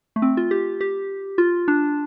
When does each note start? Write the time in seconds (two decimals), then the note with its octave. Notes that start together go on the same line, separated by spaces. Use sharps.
0.16 A3
0.22 C4
0.37 F4
0.51 G4
0.81 G4
1.38 F4
1.68 D4